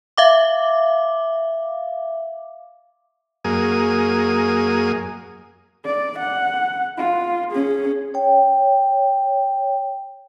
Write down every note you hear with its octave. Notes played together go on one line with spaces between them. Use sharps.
E5 F5 D6
F#2 A#3 G#4 D#6
D5
F#5
F4
C#4 G#4
C#5 G5